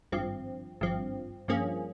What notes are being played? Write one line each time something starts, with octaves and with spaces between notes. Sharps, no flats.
G#1 G2 F3 C4
G#1 G2 F3 C4
G2 F3 A#3 C#4 G#4